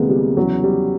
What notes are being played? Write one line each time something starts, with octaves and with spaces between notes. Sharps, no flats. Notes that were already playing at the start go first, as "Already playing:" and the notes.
Already playing: D2 C3 E3 G#3 A#3 B3
G3
E2 C#3 E3 F#3
G3